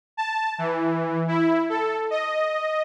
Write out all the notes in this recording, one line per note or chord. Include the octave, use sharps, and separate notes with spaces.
A5
E3
E4
A4
D#5